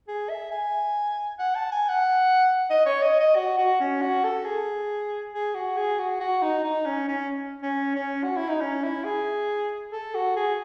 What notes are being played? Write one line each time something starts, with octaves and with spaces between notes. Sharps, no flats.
G#4
E5
G#5
F#5
A5
G#5
F#5
D#5
C#5
D#5
D#5
F#4
F#4
C#4
F#4
A4
G#4
G#4
F#4
G#4
F#4
F#4
D#4
D#4
C#4
C#4
C#4
C#4
F#4
E4
D#4
C#4
E4
G#4
A4
F#4
G#4